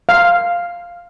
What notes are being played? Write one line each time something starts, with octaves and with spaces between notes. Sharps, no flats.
F5